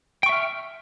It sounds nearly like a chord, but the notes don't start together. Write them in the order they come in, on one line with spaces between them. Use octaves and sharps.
G5 C#6 E5 F6